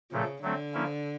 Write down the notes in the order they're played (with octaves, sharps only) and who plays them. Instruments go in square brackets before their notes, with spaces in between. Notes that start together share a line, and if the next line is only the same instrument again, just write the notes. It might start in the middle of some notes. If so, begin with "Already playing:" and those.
[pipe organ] A#2 F3 A3 [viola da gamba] C#3
[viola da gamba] D3 [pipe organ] F#3 A3 C4
[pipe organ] F3 A#3 C#4 E4